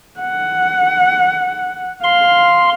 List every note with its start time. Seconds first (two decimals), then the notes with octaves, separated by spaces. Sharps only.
0.20 F#5
2.04 F5 C6